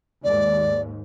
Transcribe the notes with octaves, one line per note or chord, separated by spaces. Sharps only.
D#2 G#2 D5